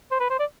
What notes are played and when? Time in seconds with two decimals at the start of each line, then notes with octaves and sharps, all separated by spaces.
0.11 C5
0.20 B4
0.30 C5
0.39 D5